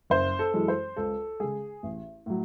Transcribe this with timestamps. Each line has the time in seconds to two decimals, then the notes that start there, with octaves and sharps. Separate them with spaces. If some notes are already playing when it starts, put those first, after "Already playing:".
0.10 F#1 C5
0.39 A4
0.54 F#2 E3 G#3
0.68 C5
0.96 C#2 A4
1.40 C#3 G#3 G#4
1.83 A1
2.26 A2 F#3